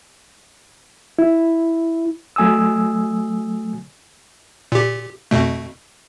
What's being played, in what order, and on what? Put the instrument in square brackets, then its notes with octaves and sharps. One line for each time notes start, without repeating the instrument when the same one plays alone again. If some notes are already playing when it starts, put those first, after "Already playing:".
[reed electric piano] E4
F#3 A3 G#5 D#6 E6
[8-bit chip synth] A#2 G4
F2 B2 A3